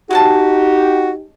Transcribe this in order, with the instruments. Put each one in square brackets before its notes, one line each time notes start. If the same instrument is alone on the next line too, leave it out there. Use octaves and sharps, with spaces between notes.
[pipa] G#3 C#4 A5 [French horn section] D#4 G4 [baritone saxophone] F#4